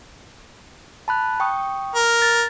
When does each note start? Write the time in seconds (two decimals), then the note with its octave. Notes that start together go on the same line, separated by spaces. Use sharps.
1.08 A5 B5 F#6
1.40 G5 C#6 D#6
1.95 A#4
2.22 A6